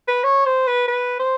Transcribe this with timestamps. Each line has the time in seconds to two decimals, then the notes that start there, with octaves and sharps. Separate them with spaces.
0.08 B4
0.24 C#5
0.46 C5
0.67 B4
0.88 B4
1.19 C5